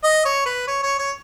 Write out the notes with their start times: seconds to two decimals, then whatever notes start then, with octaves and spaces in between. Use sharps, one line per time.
0.04 D#5
0.25 C#5
0.46 B4
0.68 C#5
0.83 C#5
0.99 C#5